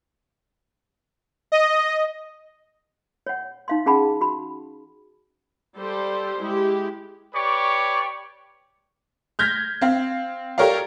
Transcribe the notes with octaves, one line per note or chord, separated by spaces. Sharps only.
D#5
C#5 F#5
D#4 F5 C6
C#4 G#4 F#5 A5 B5
F#4 B5
G3 G4 A4 C5
G#3 E4 G4
G4 B4 C#5 D5 C#6
F6 G6 G#6 A#6 B6
C4 F5
G4 A4 A#4 C#5 D5 F5